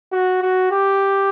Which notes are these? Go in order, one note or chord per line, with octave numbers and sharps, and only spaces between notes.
F#4
F#4
G4